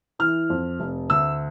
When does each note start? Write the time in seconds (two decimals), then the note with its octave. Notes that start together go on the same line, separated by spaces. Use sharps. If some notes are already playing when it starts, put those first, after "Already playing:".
0.19 E3 F6
0.50 F2
0.80 F1
1.10 D2 E6